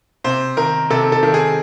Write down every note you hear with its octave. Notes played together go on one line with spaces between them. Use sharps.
C3 C5
D#3 A#4
C3 A4
A4
D#3
G#4